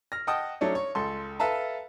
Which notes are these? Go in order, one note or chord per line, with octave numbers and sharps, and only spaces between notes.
F6 A#6
D#5 F#5 G5 A5 D#6
F#3 A3 C#4 D4
C#5
C#2 A4 C6
A4 B4 E5 F5 A5 A#5